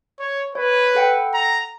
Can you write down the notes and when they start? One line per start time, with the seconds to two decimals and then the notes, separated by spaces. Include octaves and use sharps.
0.20 C#5
0.55 B4 C#5
0.95 A4 F#5 G5
1.34 A#5